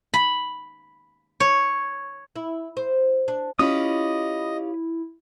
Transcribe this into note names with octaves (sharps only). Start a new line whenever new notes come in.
B5
C#5
E4
C5
D4
C#4 E4 F4 G4 D#5 B5 D#6